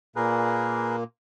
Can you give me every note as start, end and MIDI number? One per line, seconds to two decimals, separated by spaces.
0.16 1.04 46
0.16 1.04 58
0.16 0.96 68
0.16 0.96 70
0.16 0.96 71